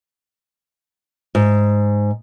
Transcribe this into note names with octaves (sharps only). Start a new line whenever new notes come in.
G#2